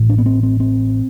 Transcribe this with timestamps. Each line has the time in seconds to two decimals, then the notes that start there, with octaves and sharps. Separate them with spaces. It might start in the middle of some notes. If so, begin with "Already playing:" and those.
Already playing: A1 A2
0.10 D4
0.18 B3
0.26 C4
0.43 C4
0.60 C4